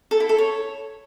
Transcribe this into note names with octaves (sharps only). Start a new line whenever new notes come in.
A4
E4
A4
C#5